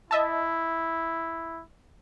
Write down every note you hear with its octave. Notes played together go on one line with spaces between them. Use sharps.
E4 D#5 E5 A5